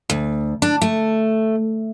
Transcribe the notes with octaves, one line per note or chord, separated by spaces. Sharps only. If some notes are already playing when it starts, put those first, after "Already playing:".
D2
D4
A3